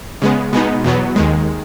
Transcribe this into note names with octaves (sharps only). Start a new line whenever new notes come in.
C#3 G#3 B3
B2 G#3 B3 D#4
E2 B2 F#3 B3
D#2 D#3 G#3